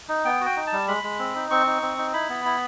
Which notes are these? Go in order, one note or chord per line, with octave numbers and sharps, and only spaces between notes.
D#4
B3 G5
F#4
G5
D#4
A5
G3
G#3 B5
G#3
C4
D#4
C4 C#6
D#4
C4
D#4
E4 B5
B3
E4